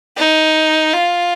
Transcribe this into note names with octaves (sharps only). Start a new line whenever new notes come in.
D#4
F4